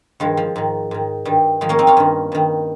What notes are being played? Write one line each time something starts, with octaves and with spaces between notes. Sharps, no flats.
G2 D#3 F3 G#3
F3
G#2 D#3
G#2 D#3
G2 D#3 G3
G#2 D#3 F3 G#3
A#3 C#4
C4 D#4
C#4 F4
G2 D#3
G2 D#3